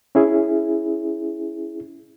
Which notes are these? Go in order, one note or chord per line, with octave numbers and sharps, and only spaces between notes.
C#4 E4 G#4